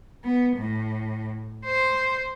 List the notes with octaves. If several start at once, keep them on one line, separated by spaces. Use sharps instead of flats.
B3
A2
C5